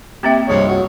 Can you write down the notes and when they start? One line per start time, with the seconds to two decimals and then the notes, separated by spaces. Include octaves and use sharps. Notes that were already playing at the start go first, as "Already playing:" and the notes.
0.23 A#3 C4 G4 E5
0.49 C2 G2 F3 G#3 C#5
0.68 F#3